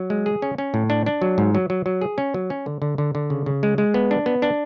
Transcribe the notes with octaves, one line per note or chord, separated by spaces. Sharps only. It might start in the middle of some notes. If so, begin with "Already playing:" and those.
Already playing: F#3
G#3
G#4
C#4
C#4
A2
D4
D4
F#3
G#2
F#3
F#3
F#3
G#4
C#4
F#3
C#4
D3
D3
D3
D3
C#3
C#3
G#3
G#3
B3
D4
B3
D4